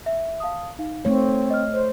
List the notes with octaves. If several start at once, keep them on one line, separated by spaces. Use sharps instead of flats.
E5
F5 A5 D#6
D#4 F5
A3 C4 C#5
D#5 F6
C5